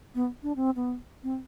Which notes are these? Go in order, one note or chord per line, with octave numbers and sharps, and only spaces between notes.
B3
D4
C4
B3
C4